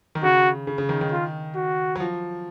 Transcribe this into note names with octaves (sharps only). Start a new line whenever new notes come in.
D#3
C#3 F#4
C#3
C#3
D#3
D#3
F4
F#4
F#3
F3